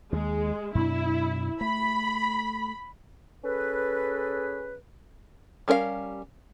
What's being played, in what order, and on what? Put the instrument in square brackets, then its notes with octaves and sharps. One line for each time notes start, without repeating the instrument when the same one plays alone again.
[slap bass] D#2 [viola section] G#3
[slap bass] F#2 B2 D4 [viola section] E4
[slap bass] A3 [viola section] B5
[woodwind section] C#4 G#4 A4 B4
[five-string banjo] G3 C#4 A#4 D5 F5